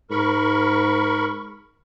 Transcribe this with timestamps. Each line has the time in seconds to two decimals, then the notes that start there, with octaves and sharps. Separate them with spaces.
0.11 G#2 A#4 B5 C#6